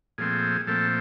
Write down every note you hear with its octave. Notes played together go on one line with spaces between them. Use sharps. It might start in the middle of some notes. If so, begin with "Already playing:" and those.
A#2 F3 A3 C4 G#4
A#2 F3 A3 C4 A4